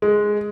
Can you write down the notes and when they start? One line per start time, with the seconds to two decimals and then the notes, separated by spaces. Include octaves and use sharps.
0.02 G#3